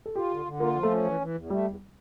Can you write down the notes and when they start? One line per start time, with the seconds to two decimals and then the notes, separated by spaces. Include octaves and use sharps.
0.06 A4
0.15 F4 G4
0.31 D3
0.45 D3
0.60 A#3 F4
0.75 F3
0.83 A3
0.90 C#4
1.04 E3
1.20 E3
1.34 E2
1.50 G3 A3
1.65 E2